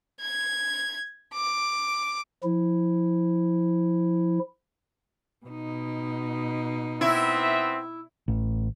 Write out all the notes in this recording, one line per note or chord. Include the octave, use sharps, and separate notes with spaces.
G#6
D6
F3 E4
B2 D#4
B3 C4 E4 E5
A1